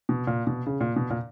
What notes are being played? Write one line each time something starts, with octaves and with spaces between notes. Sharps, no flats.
B2
A#2
B2
C#3
A#2
B2
A#2